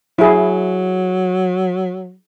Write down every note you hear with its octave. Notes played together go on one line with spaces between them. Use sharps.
F#3 E4 G#4